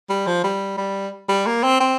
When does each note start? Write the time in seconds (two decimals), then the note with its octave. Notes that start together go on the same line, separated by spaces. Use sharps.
0.09 G3
0.27 F3
0.44 G3
0.78 G3
1.29 G3
1.47 A#3
1.63 C4
1.80 C4